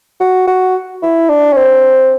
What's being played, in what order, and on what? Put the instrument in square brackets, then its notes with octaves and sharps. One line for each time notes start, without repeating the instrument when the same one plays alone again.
[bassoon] F#4
F#4
E4
D4
C#4
C4